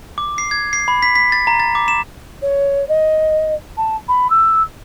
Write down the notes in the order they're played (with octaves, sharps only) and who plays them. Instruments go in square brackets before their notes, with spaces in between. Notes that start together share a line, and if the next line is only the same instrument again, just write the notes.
[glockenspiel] D6
C7
G#6
C7
B5
B6
B6
A6
A#5
A6
D6
E7
[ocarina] C#5
D#5
A5
B5
E6